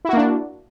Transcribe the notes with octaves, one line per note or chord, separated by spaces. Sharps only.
A#3 D4 E4 F#4